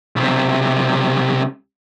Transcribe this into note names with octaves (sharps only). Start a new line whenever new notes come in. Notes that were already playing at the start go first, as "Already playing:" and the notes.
B1 C3